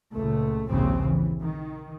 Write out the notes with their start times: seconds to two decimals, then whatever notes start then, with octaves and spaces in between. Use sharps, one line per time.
0.15 C#2 A#2 A3
0.70 A#1 D#2 G#2 C#3 F3 C4
1.06 E3
1.42 D#3